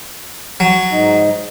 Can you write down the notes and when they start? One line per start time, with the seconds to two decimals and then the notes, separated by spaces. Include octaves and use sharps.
0.60 F#3
0.92 G#2 D#4